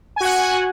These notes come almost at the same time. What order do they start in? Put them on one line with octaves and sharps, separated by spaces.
G#5 F#4 F#5